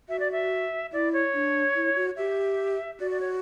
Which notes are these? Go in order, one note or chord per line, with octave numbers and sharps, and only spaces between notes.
F#4 E5
D5
E5
E4 D5
C#5
D4
E4
F#4
G4 E5
F#4 D5
D5
C#5